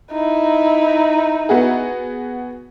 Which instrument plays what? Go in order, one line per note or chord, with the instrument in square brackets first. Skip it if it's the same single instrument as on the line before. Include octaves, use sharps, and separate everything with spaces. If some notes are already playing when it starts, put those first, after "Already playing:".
[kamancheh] D#4 E4
[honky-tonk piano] B3 F#4 G#4